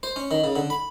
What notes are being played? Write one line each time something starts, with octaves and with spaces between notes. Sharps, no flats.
C5
C#4
D#3
C#3
D3
B5